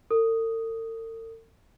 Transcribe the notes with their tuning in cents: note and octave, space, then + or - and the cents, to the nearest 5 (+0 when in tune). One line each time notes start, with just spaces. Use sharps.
A4 +45 D#6 +0